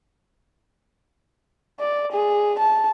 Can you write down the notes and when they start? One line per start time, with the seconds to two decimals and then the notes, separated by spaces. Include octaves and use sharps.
1.80 D5
2.12 G#4
2.59 A5